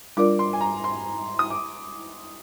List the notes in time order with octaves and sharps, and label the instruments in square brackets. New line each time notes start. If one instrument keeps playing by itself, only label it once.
[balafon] G3 D4 F4 A#4 D5 [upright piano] D6
[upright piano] C6
G#5
A#5
C6
D#6
D6